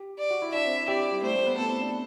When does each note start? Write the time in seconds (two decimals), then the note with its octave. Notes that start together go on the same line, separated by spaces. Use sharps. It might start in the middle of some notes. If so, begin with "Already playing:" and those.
Already playing: G4
0.18 D5
0.30 F#4
0.42 E4
0.54 D4 E5
0.65 C4
0.77 E4
0.88 G4 D5
1.00 E4
1.12 G3
1.23 A3 C5
1.35 A3
1.46 B3
1.58 B3 A4
1.70 C4
1.81 D4